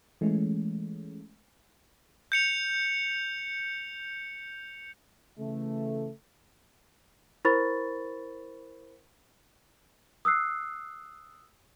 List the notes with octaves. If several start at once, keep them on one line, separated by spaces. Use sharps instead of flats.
E3 G#3 A3 C#4
G6 C#7 F7
C#3 E3 A3
E4 A#4 C5 B5 C#6 A6
D#6 E6 F#6 C7